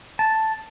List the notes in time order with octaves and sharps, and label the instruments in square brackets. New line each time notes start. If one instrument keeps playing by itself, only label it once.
[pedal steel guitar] A5